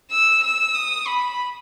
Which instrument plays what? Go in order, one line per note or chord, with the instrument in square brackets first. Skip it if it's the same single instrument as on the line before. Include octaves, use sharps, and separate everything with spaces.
[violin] E6
E6
D#6
B5